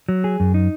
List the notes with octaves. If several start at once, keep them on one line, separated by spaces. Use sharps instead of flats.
F#3
G#4
F#2
D#4